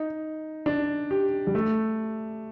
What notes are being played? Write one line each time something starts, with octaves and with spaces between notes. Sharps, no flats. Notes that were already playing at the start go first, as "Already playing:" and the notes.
Already playing: D#4
D4
G4
G3
A3